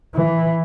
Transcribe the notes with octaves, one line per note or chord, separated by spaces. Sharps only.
E3